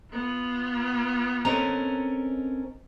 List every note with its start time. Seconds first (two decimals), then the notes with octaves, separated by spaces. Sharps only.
0.12 B3 F4
1.45 C4 C#4 A4 A#4 D#5 A#5